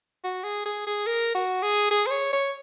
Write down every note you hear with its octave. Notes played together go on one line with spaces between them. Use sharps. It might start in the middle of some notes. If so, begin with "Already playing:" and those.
F#4
G#4
G#4
G#4
A#4
F#4
G#4
G#4
C5
C#5
C#5